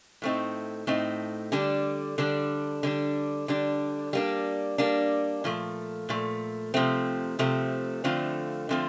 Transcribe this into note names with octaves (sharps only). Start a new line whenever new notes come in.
A2 A3 C4 D#4
A2 A3 C4 D#4
D3 G3 D4
D3 G3 D4
D3 G3 D4
D3 G3 D4
G3 A#3 D4
G3 A#3 D4
A#2 F3 A3
A#2 F3 A3
C3 F3 A3 C4
C3 F3 A3 C4
D3 F3 A3 C4 F4
D3 F3 A3 C4 F4